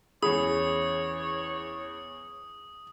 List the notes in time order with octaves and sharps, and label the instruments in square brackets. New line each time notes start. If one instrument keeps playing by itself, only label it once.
[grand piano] E2 C#4 B5 [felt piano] G#4 [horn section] C#5 [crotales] D#6